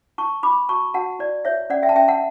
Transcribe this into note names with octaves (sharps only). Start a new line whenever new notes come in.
E4 A5 C#6
E4 B5 D6
F#4 A5 C#6
F#4 F#5 A5
E4 D5
E4 C#5 E5
C#4 D5 F#5
E5 G5
A5
C#4 E5 G5
F#5 A5